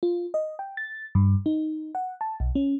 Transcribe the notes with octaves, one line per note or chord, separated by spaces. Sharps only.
F4
D#5
G5
A6
G2
D#4
F#5
A5
B1
C#4